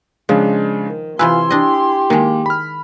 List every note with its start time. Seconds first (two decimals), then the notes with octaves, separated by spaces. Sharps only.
0.29 C#3 F3 G#3 D4
0.86 D#3
1.19 C3 E3 E4 F4 B4 G#5 C6 E6
1.51 D4 G4 D#5
2.10 D#3 G#3 A#3
2.46 B5 F6